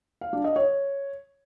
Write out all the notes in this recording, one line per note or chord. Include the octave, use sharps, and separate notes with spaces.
F5
D4
D#5
C#5